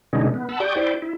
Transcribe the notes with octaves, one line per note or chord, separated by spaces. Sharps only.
B2 D3 E3 G#3 C#4 D#4
B3
F#5 A5 B5 E6
G4 D5 G5 C#6 D#6 G6
E4 C5 D5 G5
E4